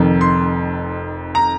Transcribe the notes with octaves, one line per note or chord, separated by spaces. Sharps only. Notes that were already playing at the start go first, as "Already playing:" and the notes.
Already playing: F1 F2 D#3
C6
A#5